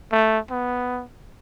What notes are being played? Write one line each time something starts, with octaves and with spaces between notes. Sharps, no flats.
A3
B3